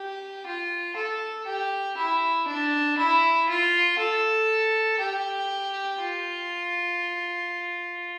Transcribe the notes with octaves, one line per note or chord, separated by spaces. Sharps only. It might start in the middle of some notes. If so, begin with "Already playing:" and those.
Already playing: G4
F4
A4
G4
E4
D4
E4
F4
A4
G4
F4